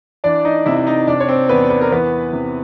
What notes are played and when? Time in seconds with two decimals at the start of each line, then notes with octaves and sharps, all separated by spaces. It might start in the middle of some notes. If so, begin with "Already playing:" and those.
0.24 E3 D4 D5
0.45 D#4 D#5
0.66 C3 E4 E5
0.76 E5
0.87 D#4 D#5
1.07 C3 D4 D5
1.20 C#5
1.28 C4 C5
1.49 E2 B3 B4
1.70 B4
1.81 A#4
1.91 E3 B3 B4
2.33 C3